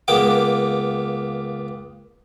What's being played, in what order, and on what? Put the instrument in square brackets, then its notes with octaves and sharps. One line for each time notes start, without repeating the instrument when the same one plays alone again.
[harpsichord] C#2 A#3 B3 G5 D6